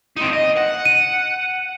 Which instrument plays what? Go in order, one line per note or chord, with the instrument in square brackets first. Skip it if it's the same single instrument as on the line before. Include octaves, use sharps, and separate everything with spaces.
[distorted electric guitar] C4 D#4
D#5
F#5
[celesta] D#7